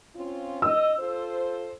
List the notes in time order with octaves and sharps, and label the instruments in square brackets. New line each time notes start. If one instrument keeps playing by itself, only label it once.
[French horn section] C4 C#4 F4
[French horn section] D#5 [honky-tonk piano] E6
[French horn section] F4 A4 C5